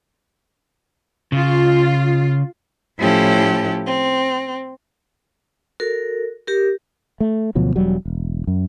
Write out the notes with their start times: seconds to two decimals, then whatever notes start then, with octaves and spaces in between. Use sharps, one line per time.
1.32 C#3 F4
2.98 A2 F3 C#4 E4 G4 A4
3.86 C4
5.80 F#4 A4 A#4
6.47 G4 A#4
7.20 A3
7.55 D2 B2 F3 F#3
7.76 E1 F#3 G3
8.05 E1
8.47 F#2